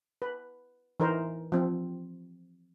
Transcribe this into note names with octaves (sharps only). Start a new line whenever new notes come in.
B4
E3 D#4 A#4 C5
F3 C4